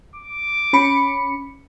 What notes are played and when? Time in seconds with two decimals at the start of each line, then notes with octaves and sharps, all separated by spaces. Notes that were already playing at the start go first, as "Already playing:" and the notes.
0.16 D6
0.73 C#4 B5 C#7